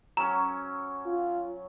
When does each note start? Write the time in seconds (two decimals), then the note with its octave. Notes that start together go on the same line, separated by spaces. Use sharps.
0.17 F#3 C#4 A#5
1.06 F4